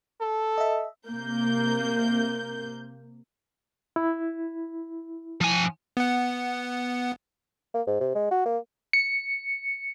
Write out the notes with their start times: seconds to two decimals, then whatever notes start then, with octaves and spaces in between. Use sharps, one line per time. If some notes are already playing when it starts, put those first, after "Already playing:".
0.21 A4
0.58 D#5 E5
1.09 C3 A#3 G6
3.96 E4
5.41 F3 G#5
5.97 B3 F#5
7.74 A#3
7.87 G#2
8.00 C3
8.15 G#3
8.31 F#4
8.46 A#3
8.93 C#7